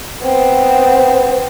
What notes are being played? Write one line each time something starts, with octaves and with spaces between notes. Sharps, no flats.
B3 C4